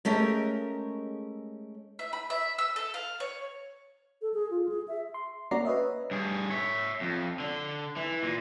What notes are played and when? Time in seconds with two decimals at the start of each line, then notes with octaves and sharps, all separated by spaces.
0.05 G#3 A3 C#4 G4 A#4
1.99 E5
2.13 B5
2.30 E5
2.59 E6
2.76 A4
2.94 F5
3.20 C#5
4.22 A4
4.34 G#4
4.51 F4
4.69 G#4
4.88 E5
5.14 C6
5.51 A#3 C#4 F#4 D5 A#5 C7
5.65 B4 C#5 D#5 E5
6.11 G2 G#4
6.50 C#5 E5
7.01 F2
7.40 D3
7.96 E3
8.23 A#2